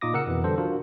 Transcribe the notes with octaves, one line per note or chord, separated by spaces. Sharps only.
A#2 D#4 F4 D6 D#6 A#6
C#3 A#4 F#5 E6 C#7
F2 B2 E3
D3 G3 A4 C5
D4 F4 F#4 A#4